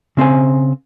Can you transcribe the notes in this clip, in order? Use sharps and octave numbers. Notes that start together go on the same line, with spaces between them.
C#3 C4 C5 G#5